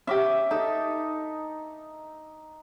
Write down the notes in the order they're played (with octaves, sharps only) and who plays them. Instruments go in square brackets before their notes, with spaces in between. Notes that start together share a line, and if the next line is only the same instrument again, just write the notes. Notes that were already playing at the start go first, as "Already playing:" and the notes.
[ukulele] C#4 G4 [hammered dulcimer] E5 D6
[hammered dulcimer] D#4 [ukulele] A4